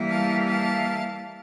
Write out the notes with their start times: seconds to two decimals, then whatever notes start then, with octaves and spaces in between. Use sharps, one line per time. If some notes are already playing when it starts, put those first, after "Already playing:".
Already playing: E3 G3 A#3 E4
0.09 F5 A5
0.47 F5 A5